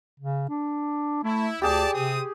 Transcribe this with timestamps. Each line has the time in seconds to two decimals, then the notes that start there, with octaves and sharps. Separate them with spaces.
0.20 C#3
0.49 D4
1.24 A3 E4
1.62 D2 G4 G#4 D5 G#5 A5
1.93 C3 C4 D#6